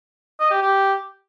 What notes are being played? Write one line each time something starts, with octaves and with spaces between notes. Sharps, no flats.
D#5
G4
G4